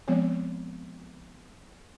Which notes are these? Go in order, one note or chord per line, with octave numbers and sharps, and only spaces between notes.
F3 G#3 B3 C4 C#5 D5